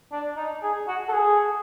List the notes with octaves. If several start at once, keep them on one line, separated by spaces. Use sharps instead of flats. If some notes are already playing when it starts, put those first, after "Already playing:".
D4
D#4
G#4
F#4
A4
G#4